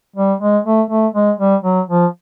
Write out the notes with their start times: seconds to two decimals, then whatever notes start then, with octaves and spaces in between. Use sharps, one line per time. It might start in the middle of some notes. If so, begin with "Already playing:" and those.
0.16 G3
0.41 G#3
0.65 A3
0.90 A3
1.14 G#3
1.39 G3
1.64 F#3
1.89 F3